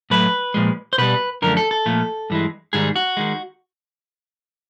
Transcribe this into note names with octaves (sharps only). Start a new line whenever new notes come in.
A2 F#3 A3 B4
A#2 F3 G#3
C5
B2 G3 B4
F#2 D3 F3 A3 A#4
A4
A4
A#2 F3 A3
G2 E3 G#3
G#2 D#3 G3 G#4
F#4
D#3 G#3